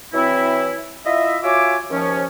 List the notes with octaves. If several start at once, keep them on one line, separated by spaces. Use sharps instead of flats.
E3 F#3 C4 E4
E4 F4 D#5 E5
F4 F#4 C#5 E5 G#5 D6
D#2 F3 C#4